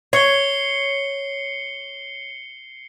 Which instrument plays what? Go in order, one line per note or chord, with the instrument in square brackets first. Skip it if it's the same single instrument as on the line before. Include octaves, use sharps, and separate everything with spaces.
[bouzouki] C#5 [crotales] C7 C#7 G7